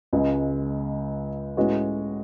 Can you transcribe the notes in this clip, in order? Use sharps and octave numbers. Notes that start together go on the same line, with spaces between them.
C#2 C#3 G#3
A2 G#3 C#4 F#4 B4